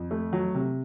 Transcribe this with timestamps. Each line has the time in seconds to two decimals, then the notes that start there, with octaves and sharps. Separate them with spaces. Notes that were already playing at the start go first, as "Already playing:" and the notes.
Already playing: F2
0.11 A3
0.33 F#3
0.55 C3